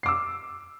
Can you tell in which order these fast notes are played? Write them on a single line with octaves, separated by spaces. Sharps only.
C7 D6 E6